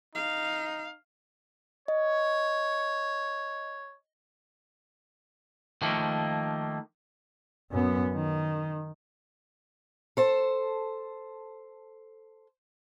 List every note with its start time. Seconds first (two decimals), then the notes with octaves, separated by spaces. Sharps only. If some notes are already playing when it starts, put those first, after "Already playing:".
0.15 D#4 F5
1.88 C#5 D#5
5.82 D#3 F3 A3 A#3
7.71 F#2 B3
8.14 D#3
10.17 A4 C5 A5